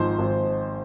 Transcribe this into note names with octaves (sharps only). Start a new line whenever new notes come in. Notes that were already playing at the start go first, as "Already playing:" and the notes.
Already playing: G#1 G#2 F3 C5
G#1